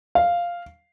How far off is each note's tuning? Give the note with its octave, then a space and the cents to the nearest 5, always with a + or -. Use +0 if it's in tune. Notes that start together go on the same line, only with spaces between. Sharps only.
F5 -5